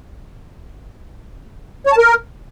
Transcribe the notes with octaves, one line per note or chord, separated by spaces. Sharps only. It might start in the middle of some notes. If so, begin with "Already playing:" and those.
C#5
A5
A#4